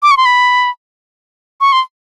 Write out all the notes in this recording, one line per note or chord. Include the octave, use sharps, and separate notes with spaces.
D6
C#6
C6
B5
C#6
C6